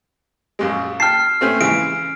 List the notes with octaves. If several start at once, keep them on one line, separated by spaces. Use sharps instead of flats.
A#1 F#2 G#3
G5 A5 F6 C7
A3 C4 C#4
C#3 E3 G#3 D7